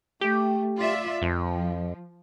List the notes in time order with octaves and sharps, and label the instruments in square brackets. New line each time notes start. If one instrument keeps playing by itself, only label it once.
[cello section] A3 [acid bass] G4
[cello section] F4 D5 E5
[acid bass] F2 [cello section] F3